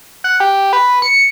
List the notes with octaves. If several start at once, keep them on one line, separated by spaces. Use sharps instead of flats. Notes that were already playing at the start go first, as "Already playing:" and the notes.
F#5
G4
B4
C#7